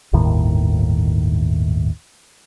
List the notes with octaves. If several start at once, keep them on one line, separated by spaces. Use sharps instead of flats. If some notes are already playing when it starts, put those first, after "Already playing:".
G1 D#2 A2 D#3